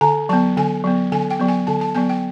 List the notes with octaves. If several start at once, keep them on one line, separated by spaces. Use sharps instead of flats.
D3 A#5
F#3 B3 A5
D3 G#5
F#3 B3
D3 G#5
G5
F#3 B3
G#5
D3 A5
A5
F#3 B3 G#5
G5